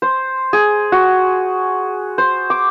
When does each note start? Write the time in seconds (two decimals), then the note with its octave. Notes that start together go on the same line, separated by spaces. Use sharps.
0.02 C5
0.53 G#4
0.92 F#4
2.18 C5
2.50 D6